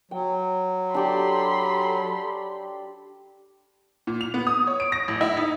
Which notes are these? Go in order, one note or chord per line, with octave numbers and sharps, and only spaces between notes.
F#3 G5
D4 G4 A4 B5 C6 D6
A#2
F7
B3
D#6
C#5
D7
A#6
A1
E4
D#4